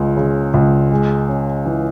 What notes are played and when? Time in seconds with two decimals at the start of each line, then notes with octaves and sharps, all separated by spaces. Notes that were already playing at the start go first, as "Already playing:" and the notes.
Already playing: C#2 G#3
0.17 C#3
0.54 C#2
0.91 G#3
1.29 C#4
1.65 E3